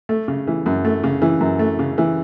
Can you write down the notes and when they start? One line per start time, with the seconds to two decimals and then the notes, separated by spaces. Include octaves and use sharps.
0.09 A3
0.28 C#3
0.47 E3
0.66 F#2
0.85 A3
1.04 C#3
1.22 E3
1.40 F#2
1.59 A3
1.79 C#3
1.98 E3